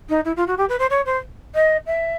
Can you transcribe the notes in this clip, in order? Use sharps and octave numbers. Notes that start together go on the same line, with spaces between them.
D#4
E4
F4
F#4
G4
B4
C5
C#5
C5
D#5
E5